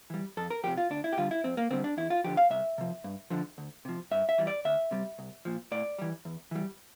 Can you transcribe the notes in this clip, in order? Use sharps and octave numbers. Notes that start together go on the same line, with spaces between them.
E3 G3
F2 A4
A#4
C3 F3 G4
F4
D2 D4
E4
G4
D3 G3 F4
E4
F2 C4
A#3
D3 G3 C4
D4
E2 E4
F4
D3 F3 G4
F5
C2 E5
C3 F3
G2
D3 F3
D2
C3 F3
G2 E5
E5
E3 G3
D5
D2 E5
C3 G3
C2
A#2 F3
A2 D5
E3 G3
E2
E3 G3